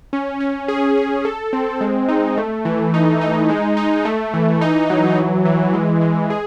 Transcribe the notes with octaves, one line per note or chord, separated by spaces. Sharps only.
C#4
C#4
G#4
G#4
A4
C4
G#3
D#4
A3
E3
D#4
D#4
G#3
D#4
A3
E3
D#4
F#3
E3
E3
G#3
G#3
G#4